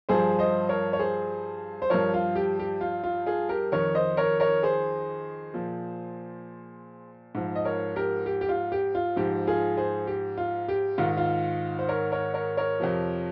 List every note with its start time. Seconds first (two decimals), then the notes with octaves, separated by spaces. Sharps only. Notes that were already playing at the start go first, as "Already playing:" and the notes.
0.09 G2 F3 G#4 C5
0.39 C5 D#5
0.69 A#4 C#5
0.93 C#5
0.99 G#4 C5
1.82 C5
1.90 G2 F3 A#4 C#5
2.14 F4
2.35 G4
2.59 G4
2.81 F4
3.04 F4
3.26 F4 G#4
3.49 G4 A#4
3.72 F2 D#3 A#4 C#5
3.95 C5 D#5
4.17 A#4 C#5
4.40 A#4 C#5
4.63 G#4 C5
5.54 A#2 F3
7.35 G#2 F3
7.56 D#5
7.65 A#4 C#5
7.96 G4 A#4
8.26 G4
8.41 G4
8.49 F4
8.72 G4
8.95 F4
9.16 G#2 F3 G4
9.47 F4 G#4
9.77 G#4 C5
10.07 G4
10.38 F4
10.68 G4
10.98 G#2 D#3 F4
11.17 F4
11.79 C5
11.89 A#4 C#5
12.12 A#4 C#5
12.34 A#4 C#5
12.57 A#4 C#5
12.80 F2 C3 F3